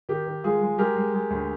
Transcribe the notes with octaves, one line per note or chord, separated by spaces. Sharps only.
D#3 G4
D#3
G#3 F4 G#4
G#3
G#3 G4 A#4
G#3
G#3
D2